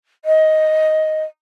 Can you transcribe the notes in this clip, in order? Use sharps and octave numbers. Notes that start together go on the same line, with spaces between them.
D#5